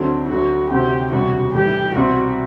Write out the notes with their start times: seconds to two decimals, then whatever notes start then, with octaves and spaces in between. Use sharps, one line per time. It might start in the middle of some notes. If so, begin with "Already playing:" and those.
Already playing: D2 D3 F#3 A3 C4 D4
0.29 D2 D3 F#3 F#4
0.70 D2 C3 F#3 C4 F#4 G4
1.12 E1 D2 C3 G3 F#4
1.54 A2 E3 G3 G4
1.95 C2 B2 G3 C4 F#4 G4